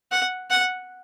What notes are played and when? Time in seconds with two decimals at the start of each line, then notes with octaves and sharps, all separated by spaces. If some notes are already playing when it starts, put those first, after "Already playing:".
0.11 F#5
0.50 F#5